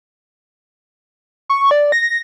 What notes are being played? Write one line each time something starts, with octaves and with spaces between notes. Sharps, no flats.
C#6
D5
A#6